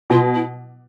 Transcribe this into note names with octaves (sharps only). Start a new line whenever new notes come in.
B2 F4
E4